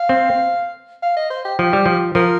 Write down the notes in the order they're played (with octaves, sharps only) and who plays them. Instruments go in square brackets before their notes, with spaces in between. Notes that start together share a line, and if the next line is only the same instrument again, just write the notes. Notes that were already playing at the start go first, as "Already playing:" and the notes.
Already playing: [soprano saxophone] F5
[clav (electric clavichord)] C4
[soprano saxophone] F5
D#5
C5
G4
[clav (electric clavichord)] F3 [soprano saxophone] G4
[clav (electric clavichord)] G3
F3
[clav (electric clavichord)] F3 [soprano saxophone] A#4